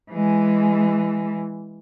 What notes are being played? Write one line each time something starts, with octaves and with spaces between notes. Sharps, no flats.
E3 G#3